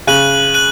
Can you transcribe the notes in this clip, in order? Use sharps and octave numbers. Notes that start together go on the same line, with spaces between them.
C#3 F#6 D#7 F#7
F#6 D#7 F#7